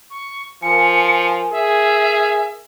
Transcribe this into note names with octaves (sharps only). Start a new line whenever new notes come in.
C#6
F3 A#4 G#5 C#7
G#4 E5